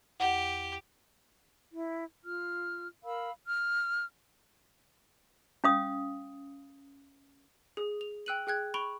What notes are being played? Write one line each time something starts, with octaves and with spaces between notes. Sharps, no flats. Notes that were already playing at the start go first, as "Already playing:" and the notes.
E2 G4 F#5
E4
F4 F6
A#4 F5 B5 E6
F6
C#4 F5 D#6
G#4 D#6
F7
G5 E6 F#6 D#7 F#7
G#4 G5 F#6 G#6
B5 C#6 D7 F7 G7